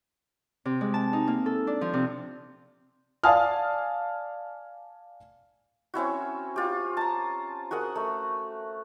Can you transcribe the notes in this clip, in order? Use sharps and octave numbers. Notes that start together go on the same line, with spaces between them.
C3
G#3
A5
D#4
A#3
A4
D4
F3
C3
D5 F5 G#5 A5 D#6 F6
C4 C#4 E4 F#4
F4 G4
A5 A#5
F#4 G#4 A#4 F#5
A3